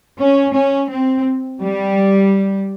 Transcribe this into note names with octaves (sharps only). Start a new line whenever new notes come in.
C#4
C#4
C4
G3